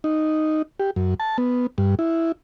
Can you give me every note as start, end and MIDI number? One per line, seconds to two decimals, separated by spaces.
0.04 0.62 63
0.80 0.91 67
0.96 1.14 42
1.20 1.37 81
1.38 1.67 59
1.78 1.95 43
1.99 2.32 64